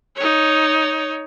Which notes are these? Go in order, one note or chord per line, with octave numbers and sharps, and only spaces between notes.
D#4 C#5